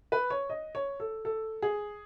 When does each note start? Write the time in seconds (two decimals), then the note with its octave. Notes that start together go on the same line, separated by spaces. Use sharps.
0.12 B4
0.30 C#5
0.50 D#5
0.75 C#5
1.00 A4
1.25 A4
1.62 G#4